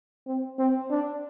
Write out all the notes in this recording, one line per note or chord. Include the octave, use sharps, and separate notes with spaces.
C4
C4
D4